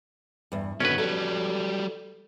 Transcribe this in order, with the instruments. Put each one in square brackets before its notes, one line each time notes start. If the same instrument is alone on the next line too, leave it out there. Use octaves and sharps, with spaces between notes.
[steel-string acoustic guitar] E2 G2
[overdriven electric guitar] B2 D3 [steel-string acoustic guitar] D#3 B3 [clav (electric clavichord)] C#4 B4
[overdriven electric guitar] F#3 G3 [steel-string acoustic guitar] A4